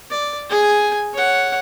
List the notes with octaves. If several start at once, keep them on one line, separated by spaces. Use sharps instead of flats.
D5
G#4 G#5
C#5 F#5